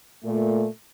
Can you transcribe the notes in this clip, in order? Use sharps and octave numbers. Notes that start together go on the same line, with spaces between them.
A#2 A3